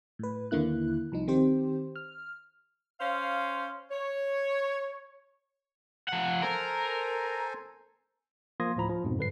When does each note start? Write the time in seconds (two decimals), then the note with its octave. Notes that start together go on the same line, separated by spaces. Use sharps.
0.19 A2 B4
0.51 D#2 D3 A#3 E4 F#6
1.12 C2 F3 D#4
1.28 D#3 C4 G4 C5
1.96 F6
3.00 C#4 C5 F5
3.91 C#5
6.08 F3 F#5
6.42 A4 A#4 C5 G#5
8.60 F3 A#3 C6 D#6 G#6 A#6
8.76 D2 A2 F3 A#5 B5
8.90 F3
9.04 F2 G#2 B2
9.18 G2 D3 B4 C7